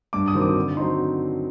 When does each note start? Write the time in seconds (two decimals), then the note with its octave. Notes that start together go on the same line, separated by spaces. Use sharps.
0.13 G2 D6
0.28 D#6
0.35 D#3 F#3 C4
0.42 D6
0.56 D3
0.77 D#4 C6
0.80 F#3 C4